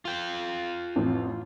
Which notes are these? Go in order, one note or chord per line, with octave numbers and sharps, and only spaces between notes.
F4 G5
A1 F2